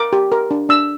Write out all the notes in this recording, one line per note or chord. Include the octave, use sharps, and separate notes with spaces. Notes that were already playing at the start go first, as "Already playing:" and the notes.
Already playing: A#4 D6
G4
A#4
D4
D4 E6